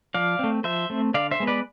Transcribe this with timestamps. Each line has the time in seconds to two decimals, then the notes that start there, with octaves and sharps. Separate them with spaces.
0.14 F3 D5 F5
0.39 A3 C4
0.64 F3 C5 E5
0.90 A3 C4
1.14 D3 D5 F5
1.31 C5 E5
1.40 G#3 B3
1.47 B4 D5